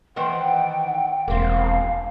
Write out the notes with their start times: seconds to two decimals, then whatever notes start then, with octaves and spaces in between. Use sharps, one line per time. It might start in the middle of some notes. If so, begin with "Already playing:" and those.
0.16 D#3 E3 C5 F#5 G5
1.28 E1 A#3 C4 F5